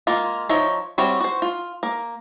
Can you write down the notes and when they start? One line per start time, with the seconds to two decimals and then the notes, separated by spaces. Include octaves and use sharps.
0.07 G#3 A#3 F4
0.49 F3 D#4 C#5 E5
0.98 G3 C4 F#4 C#5 E5
1.21 F#4 C5
1.42 F4
1.83 A#3